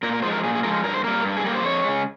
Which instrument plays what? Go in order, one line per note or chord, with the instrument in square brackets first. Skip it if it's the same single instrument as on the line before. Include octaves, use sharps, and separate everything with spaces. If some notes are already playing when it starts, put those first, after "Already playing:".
[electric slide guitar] A#2 A#4
A#4
F3 G#3 C5
A#4
A#2 G#4
G#4
F3 G#3 A#4
G2 A#4
C5
G3 A#3 A#4
G2
G#4
G3 A#3 A#4
C5
F2 C#5
C#3 G#3